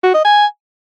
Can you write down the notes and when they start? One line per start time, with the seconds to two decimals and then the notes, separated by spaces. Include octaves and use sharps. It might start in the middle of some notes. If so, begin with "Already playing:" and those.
0.03 F#4
0.14 D#5
0.25 G#5